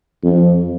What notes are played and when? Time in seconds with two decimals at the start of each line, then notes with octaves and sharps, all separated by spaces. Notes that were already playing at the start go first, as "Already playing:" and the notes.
0.24 F2